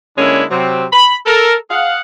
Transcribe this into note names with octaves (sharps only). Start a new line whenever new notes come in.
D3 G#3 A#3 C#4 D4 E4
C3 F#3 C4
B5
A4 A#4
G#4 F5 F#5